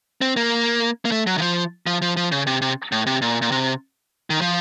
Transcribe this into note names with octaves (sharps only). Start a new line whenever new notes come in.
C4
A#3
A#3
A3
F#3
D#3
F3
F3
F3
F3
C#3
C3
C3
A2
C3
A#2
A#2
C3
D#3
F3